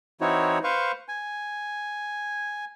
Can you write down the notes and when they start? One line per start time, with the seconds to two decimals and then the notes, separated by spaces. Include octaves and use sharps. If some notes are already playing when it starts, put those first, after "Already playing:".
0.21 E3 C4 D#4 E4 F#4 C#5
0.64 B4 C5 F5 C#6
1.08 G#5